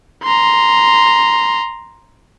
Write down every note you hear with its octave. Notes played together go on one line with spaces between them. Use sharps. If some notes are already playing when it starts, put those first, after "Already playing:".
A#5 C6